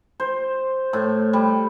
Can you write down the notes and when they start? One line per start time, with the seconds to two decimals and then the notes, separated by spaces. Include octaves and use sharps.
0.20 C5
0.93 A2
1.33 G3